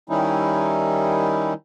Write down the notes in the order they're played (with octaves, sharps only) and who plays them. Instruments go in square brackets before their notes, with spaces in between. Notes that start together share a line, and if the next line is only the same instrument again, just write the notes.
[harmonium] D#3 G3 C#4 D#4 E4